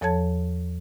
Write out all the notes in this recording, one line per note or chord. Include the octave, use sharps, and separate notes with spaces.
E2 F3 A4 C#5 A5 G#6